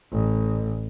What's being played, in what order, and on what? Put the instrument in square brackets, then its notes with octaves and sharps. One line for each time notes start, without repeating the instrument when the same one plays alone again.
[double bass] A1